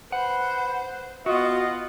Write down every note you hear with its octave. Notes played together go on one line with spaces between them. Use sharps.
B4 C5 F#5
B3 F4 F#4 D#5 F#5